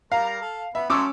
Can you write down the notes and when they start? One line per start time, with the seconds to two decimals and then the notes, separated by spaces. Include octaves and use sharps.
0.12 G3 A#4 F5 A#5
0.42 A4
0.75 B3 E5 B5
0.90 F#3 A3 C#4 C6 D6 E6